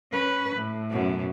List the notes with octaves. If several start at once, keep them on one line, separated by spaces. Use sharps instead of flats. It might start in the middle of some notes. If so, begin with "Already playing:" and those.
C#4 B4
A2
F#2 B2